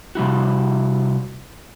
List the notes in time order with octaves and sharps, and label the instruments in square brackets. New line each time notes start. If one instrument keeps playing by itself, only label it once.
[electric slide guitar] C3 G3 E4 F#4